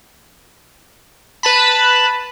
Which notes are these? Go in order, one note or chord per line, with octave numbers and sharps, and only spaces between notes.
B4 A5 B5